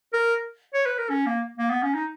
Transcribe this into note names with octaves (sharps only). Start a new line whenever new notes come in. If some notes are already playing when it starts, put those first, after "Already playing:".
A#4
C#5
B4
A#4
C#4
A#3
A#3
B3
C#4
D#4